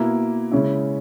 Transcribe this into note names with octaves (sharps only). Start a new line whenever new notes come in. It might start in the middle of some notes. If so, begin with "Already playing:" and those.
Already playing: B2 A#3 E4
C#3 G#3 C#4 E4